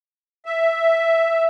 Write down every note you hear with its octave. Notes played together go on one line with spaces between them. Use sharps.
E5